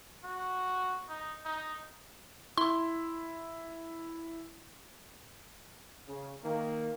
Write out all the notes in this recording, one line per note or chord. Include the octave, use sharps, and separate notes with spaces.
F#4
D#4
D#4
E4 C6
C#3
D#3 A#3